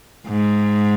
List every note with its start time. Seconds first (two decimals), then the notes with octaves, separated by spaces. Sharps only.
0.27 G#2